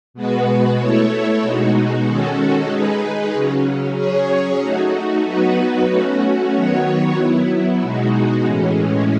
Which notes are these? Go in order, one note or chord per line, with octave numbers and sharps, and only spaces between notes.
B2 G#3 B3 F#4 B4
A3 E4 A4 C#5
B2 G#3 D#4 F#4
D#3 G#3 C#4 F#4 A4
G#3 D#4 G#4 B4
C#3 F#3 C#4
F#3 C#4 G#4 C#5
A3 D#4 F#4
F#3 B3 D#4 F#4 B4
A3 C#4 F#4
D#3 F#3 B3 F#4 C#5
F#3 B3 E4
B2 G#3 D#4 F#4
A2 E3 G#3 C#4